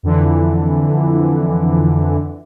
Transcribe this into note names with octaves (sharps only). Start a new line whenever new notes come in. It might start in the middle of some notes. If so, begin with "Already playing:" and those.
F2 D3 E3